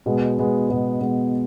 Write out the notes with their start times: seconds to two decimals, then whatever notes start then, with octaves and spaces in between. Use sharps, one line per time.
0.06 B2 G#3 B3
0.38 B2 G#3 B3
0.69 B2 G#3 B3
1.00 B2 G#3 B3